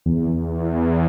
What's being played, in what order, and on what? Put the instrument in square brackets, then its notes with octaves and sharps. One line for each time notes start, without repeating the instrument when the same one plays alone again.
[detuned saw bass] E2